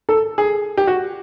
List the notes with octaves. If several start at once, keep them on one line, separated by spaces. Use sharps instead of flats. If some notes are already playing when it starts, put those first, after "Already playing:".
A4
G#4
G4
F#4